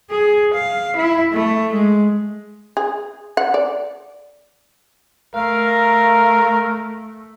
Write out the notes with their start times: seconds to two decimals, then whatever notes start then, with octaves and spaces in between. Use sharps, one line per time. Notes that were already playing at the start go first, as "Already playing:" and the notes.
0.11 G#4
0.54 F5
0.96 E4
1.33 A3
1.72 G#3
2.77 G#4
3.37 F#5
3.54 D5
5.35 A3 A#4 F5